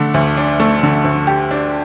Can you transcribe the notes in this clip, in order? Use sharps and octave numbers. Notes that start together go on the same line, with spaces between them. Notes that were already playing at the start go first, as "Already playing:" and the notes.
Already playing: D3 A3 D4
D2
D4
A3
D3
D2
G4
D4